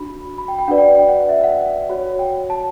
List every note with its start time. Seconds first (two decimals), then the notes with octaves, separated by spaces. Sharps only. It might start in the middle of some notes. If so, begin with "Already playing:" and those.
Already playing: D4 F#4 B5
0.38 B5
0.48 G5
0.59 G5
0.68 D4 F#4 B4 D5 F#5
0.78 G5
0.88 G5
0.99 G5
1.08 F#5
1.29 E5
1.44 F#5
1.89 F#4 C#5
2.19 G5
2.50 A5